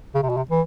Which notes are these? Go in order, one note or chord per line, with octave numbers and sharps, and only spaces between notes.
C#3
C3
B2
C3
E3